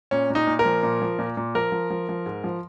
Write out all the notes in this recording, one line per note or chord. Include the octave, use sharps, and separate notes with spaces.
A#2 C#4
A#2 D#4
A#2
A#4
F3
A#2
F3
A#2
A#2
F3 A#4
F3
F3
F3
G#2
F3